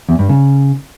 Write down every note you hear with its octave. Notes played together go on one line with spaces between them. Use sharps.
E2
G2
C#3